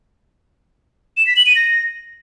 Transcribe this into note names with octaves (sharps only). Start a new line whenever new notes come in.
E7
B6
F#7
D#7
A#6